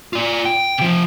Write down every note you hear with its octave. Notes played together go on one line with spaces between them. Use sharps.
F4 D5
G5
C3 F3